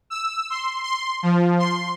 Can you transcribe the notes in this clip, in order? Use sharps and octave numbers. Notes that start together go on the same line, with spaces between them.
E6
C6
C6
F3
C6